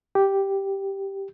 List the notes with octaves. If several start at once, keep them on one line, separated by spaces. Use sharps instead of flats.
G4